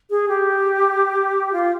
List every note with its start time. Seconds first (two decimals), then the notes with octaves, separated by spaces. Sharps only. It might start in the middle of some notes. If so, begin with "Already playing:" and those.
0.10 G#4
0.29 G4
1.53 F4